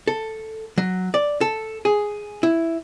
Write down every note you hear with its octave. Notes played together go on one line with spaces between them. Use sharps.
A4
F#3
D5
A4
G#4
E4